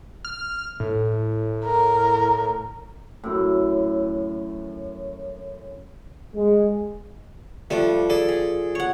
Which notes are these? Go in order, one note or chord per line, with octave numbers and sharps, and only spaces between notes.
F6
A2
A#4
F#2 A2
G#3
F3 G3 A3 D4
G#4 A4 D5 A5
G#4
C#5 F#5